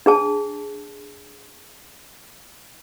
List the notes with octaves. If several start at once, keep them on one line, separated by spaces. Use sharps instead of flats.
D4 G#4 A5